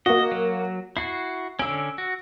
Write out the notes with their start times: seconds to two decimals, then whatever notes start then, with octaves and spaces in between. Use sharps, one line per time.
0.06 A#3 F#4 D#5
0.32 F#3
0.97 E4 F#4 C7
1.59 D3 C#4 E6 D7
1.98 F#4